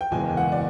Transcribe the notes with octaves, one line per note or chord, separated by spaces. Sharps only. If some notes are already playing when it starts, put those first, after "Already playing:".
G5
F#1 E2 B2 G#3 G#5
F#5
D5